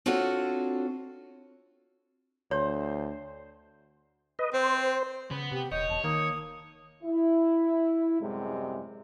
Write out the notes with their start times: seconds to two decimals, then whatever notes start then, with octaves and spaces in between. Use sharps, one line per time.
0.06 C4 D4 F4 F#4 A4 C#5
2.51 D2 C5 C#5
4.39 B4 D#5
4.54 C4 C5
5.31 C#3 B3 B4
5.52 C3 G4
5.72 D#1 C#5 D#5 G6
5.89 E1 A5
6.04 D#3 A#3 D#6
7.03 E4
8.21 F#2 A2 C3 G3 G#3